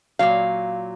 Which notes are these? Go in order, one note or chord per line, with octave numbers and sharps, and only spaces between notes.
A#2 F#3 F5